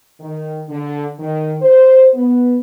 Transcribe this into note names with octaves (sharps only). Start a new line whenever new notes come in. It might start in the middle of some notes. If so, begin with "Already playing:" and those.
D#3
D3
D#3
C5
B3